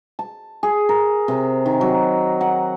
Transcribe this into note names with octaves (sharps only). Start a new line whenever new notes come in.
A5
G#4
A#4
C3
D#3
F#3
F#5